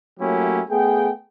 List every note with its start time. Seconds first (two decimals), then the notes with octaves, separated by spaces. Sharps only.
0.20 F#3 A3 A#3 C#4 E4 G4
0.71 A3 B3 G#4 G5